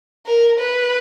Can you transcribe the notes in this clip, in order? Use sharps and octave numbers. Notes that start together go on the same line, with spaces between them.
A#4
B4